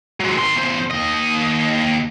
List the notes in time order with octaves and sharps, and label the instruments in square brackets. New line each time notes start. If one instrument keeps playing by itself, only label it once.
[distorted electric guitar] F#3 G#3
D#3 C6
E2 C5
D#2 D#5